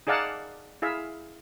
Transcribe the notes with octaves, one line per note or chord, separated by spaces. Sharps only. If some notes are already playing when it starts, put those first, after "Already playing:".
D#4 G#4 D5 F5 F#5 A5
E4 G#4 E5 F5